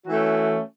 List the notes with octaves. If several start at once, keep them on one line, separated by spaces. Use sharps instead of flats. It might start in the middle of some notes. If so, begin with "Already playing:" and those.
E3 A3 C#4 F#4